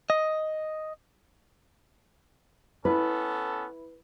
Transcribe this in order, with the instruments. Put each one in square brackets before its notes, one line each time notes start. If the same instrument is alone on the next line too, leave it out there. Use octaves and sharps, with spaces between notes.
[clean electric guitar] D#5
[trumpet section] B3 C#4 A4 [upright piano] E4 [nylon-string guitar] B4